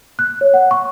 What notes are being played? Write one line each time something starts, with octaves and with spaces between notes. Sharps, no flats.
F#6
C#5
F#5
C#6